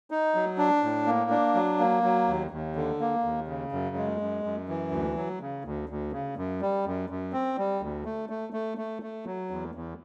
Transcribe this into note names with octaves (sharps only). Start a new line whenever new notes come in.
D#4
F#3
D4
A2
A#3
D4
F#3
A#3
F#3
D#2
D#2
D3
A#3
D#2
C#3
F#2
G#3
F#2
F#2
E3
D2
F#3
C#3
D2
D2
C#3
F#2
G3
F#2
F#2
C4
G3
D2
A3
A3
A3
A3
A3
F#3
E2
E2